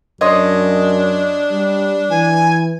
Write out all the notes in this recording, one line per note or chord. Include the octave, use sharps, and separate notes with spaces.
F#2 D4 C#5 D#5 C6
G3
E3 G#5